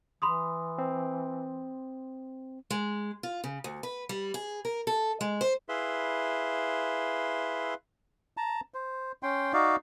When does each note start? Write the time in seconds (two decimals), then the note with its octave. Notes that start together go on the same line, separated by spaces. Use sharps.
0.22 E3 B5 C6 D#6
0.78 C4
2.70 G#3
3.23 F4
3.44 C#3
3.64 D2
3.83 B4
4.09 G3
4.34 G#4
4.65 A#4
4.87 A4
5.21 G#3
5.41 C5
5.69 E4 G#4 B4 E5 F5 C6
8.37 A5 A#5
8.74 C5
9.23 C#4 G5 C6
9.53 D#4 F#4 D5 F5